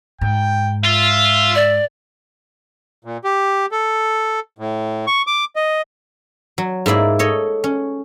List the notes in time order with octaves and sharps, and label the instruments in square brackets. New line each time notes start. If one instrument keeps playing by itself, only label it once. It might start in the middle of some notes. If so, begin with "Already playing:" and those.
[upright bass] G#2 [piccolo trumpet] G5
[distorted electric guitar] F4 [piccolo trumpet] E5
[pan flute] D5
[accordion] A#2
G4
A4
A2
C#6
D6
D#5
[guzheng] F#3
G#2 A#3 E4 D5
A4 C#5 D#5
C#4